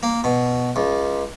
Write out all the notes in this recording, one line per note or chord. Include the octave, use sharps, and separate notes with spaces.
A#3
B2
C#2